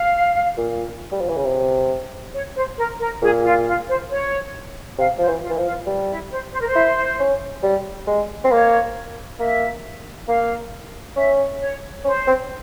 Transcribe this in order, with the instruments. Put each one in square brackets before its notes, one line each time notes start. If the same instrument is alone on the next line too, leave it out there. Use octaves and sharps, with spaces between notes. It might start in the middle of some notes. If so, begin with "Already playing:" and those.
Already playing: [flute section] F5
[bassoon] A#2
G3
F3
E3
C#3
C3
[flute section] C#5
C5
A#4
A#4
[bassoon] A#2 [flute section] G#4
[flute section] F4
F4
C5
C#5
[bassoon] C3 [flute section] F5
[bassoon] F3 [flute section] C5
[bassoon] E3
[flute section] F4
[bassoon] E3
F3
[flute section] F4
[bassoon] G3
[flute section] E4
C5
C5
A#4
C5
[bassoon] E4
C#4
G3
G#3
C4
[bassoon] A#3 [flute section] C#5
[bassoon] A#3 [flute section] E5
[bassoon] A#3 [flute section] F5
[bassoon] C#4 [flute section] E5
[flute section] C#5
[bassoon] C#4 [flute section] C5
[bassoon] C4